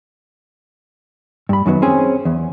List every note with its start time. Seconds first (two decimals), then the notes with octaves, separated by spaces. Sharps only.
1.49 G2 B5
1.66 F#2 D#3 F#3 B3
1.82 C4 C#4 G#4
2.25 E2